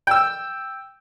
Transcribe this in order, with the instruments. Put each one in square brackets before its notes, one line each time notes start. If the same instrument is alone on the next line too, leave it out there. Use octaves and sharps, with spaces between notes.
[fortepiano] G5 E6